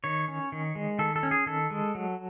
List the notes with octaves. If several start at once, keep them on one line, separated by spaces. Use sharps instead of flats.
D#3 C#5
C#4
D#3
G#3
D#3 A4
A4
C#4
G#4
D#3 A4
G#3
F#3